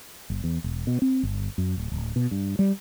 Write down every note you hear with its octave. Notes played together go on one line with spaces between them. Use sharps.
F#1
E2
E1
B2
C4
G1
F#2
D1
D1
B2
G2
G3